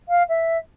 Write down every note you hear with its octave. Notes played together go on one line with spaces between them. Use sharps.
F5
E5